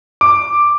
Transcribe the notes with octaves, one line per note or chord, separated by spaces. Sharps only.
D6